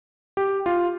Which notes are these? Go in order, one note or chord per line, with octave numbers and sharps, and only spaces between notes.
G4
F4